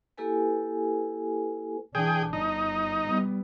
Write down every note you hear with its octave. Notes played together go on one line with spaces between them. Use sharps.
A#3 E4 G4 A4 B4 G#5
E3 D4 G#4 G5
G1 D#4
G3 B3